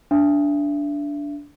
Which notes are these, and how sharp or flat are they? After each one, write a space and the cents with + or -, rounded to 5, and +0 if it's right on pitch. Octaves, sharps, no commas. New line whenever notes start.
D4 -15 E5 +35